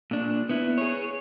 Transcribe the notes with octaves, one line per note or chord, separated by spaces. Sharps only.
A#2 D4
B3 E4
G#4 C#5